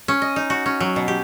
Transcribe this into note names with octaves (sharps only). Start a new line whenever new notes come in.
C#4
D#5
D#4
F#4
C#4
F#3
B2
G4